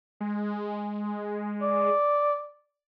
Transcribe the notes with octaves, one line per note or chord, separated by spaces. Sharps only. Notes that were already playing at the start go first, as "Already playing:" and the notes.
G#3
D5